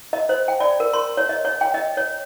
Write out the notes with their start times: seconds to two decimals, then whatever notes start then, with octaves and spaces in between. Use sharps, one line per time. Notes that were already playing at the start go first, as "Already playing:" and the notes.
0.13 D#5
0.29 C5
0.48 G5
0.60 D5
0.80 A#4
0.93 C6
1.17 C#5
1.29 D#5
1.45 C#5
1.61 G5
1.74 D#5
1.97 C#5